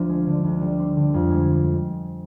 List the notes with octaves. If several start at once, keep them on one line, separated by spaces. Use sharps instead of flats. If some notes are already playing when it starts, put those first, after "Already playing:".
Already playing: D2 F3
G#3
D3
D2
G3
C4
D3
F2
G#3